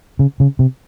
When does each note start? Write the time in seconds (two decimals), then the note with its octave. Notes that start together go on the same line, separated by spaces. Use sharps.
0.19 C#3
0.40 C#3
0.59 C3